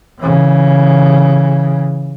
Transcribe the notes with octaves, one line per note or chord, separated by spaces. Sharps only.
C#3 E3